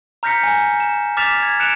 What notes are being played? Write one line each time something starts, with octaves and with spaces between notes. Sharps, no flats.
A#5 F6 G6 A#6 B6 C#7
G#5
E7
D6 F6 A6 B6 E7 F7
G#6
F#6 C#7 D7 E7 F7